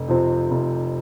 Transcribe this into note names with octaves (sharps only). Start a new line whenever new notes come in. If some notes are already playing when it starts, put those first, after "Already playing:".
Already playing: F1
F2 C3 F3 C4
F1